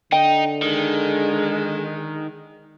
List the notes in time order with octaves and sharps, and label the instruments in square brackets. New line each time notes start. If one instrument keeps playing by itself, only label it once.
[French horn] D3 [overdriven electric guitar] D#4 [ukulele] G5
[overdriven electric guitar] D#3 [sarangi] G#3